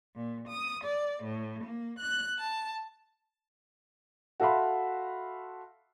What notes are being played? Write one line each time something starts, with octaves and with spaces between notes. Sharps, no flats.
A#2
D#6
D5
A2
A#3
F#6
A5
F#4 A4 E5 F5 B5 C6